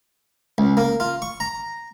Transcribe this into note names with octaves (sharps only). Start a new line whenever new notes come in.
C#2
A#3
F4
C#6
A#5